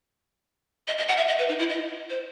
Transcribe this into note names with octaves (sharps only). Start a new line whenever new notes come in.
D#5
D#5
F#5
E5
D#5
B4
D#4
E4
D#5
C5